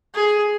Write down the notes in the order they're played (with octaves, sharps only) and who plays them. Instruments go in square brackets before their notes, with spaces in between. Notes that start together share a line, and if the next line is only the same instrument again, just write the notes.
[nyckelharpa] G#4